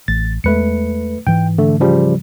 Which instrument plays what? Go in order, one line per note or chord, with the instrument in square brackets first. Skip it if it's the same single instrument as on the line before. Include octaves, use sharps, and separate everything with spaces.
[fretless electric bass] A1 [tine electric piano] A6
[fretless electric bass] E2 G#3 [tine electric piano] A3 B4 C#7
[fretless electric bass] G#2 E3 [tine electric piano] G5
[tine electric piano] D3 A3
C#3 F3 G3